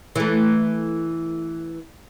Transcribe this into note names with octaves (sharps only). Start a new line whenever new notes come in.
E3 A3